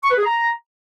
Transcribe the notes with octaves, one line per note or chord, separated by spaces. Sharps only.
C#6
B4
G#4
A#5